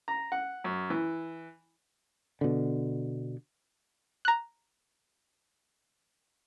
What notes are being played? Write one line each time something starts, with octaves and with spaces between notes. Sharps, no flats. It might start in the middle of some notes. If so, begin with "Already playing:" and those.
A#5
F#5
F#2
E3
B2 D3
A#5 F#6